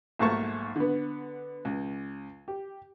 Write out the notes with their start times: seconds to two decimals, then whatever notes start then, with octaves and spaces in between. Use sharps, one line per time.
0.19 B1 G#2 A3 A#3 A5 C#6
0.76 D3 B3
1.65 C#2
2.48 G4